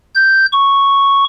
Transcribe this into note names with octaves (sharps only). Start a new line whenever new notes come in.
G6
C#6